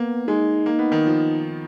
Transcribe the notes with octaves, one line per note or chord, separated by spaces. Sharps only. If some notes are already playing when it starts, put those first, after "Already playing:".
Already playing: A#3 B3
G#3 D#4
A#3
B3
D#3
F3